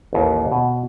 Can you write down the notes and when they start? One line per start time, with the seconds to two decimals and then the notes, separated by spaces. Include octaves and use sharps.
0.13 A1 D#2
0.52 B2